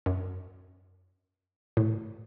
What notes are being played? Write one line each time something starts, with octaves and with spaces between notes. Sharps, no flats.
F#2
A2